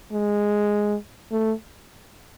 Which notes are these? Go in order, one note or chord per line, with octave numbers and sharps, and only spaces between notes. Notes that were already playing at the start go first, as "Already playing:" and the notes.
G#3
A3